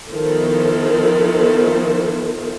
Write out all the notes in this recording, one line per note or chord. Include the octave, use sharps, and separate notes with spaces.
D#3 F3 B3 E4 A4 C5